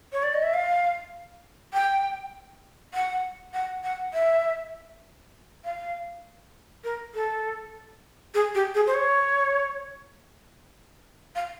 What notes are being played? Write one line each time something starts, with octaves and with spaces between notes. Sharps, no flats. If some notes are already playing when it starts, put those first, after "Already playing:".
C#5
D5
D#5
E5
F5
G5
F#5
F#5
F#5
E5
F5
A#4
A4
G#4
G4
G#4
C5
C#5
F5